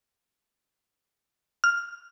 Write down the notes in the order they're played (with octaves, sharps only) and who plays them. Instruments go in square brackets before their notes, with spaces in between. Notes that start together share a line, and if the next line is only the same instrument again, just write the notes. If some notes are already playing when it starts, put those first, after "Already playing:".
[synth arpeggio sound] F6